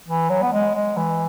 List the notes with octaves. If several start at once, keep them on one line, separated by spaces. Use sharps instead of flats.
E3
F#3
B3
G#3
G#3
E3